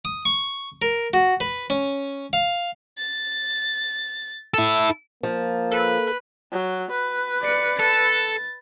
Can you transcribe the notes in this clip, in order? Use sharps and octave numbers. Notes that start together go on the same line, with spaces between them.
D#6
C#6
A#4
F#4
B4
C#4
F5
A6
E4 A4
F3 A#3
A4 B4
F#3
B4
D5 C#7
A4 A6